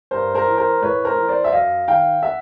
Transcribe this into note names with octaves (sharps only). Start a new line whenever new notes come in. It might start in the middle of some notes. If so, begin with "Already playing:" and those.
G2 A#4 C5
A#4 C5
E3
A#4 C5
A2 B4 C#5
A#4 C5
E3
C5 D5
E5
F#2 D#5 F5
D#3 F5 G5
E5 F#5